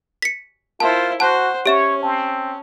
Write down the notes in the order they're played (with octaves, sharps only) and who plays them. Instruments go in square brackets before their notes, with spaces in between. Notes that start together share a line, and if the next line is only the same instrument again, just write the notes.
[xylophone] B6 C#7
[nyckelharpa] E4 C5 [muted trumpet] F4 [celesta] A#4 E5 [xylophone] A5
[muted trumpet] F#4 [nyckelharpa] C5 [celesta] F#5 F#6 [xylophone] A5
[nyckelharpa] C#4 [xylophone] G4 E5 E7 [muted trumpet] C#5
[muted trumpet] C4 [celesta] A5